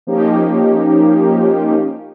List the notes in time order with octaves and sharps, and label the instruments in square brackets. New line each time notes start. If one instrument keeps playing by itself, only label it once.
[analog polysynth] F3 A#3 C#4 D#4 G4